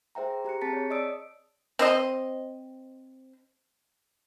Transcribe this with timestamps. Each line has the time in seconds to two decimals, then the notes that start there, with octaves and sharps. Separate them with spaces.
0.15 G#4 C5 E5 G5 A#5
0.45 G4 A#5 F#6 C#7
0.61 C4 G#4 A5 A6 B6 C#7
0.73 C#5
0.90 D5 D#5 D#6 E6 D7
1.79 C4 C5 D#5